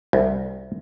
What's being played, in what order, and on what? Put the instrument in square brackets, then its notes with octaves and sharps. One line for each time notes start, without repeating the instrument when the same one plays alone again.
[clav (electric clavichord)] C2